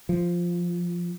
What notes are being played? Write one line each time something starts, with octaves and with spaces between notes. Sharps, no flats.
F3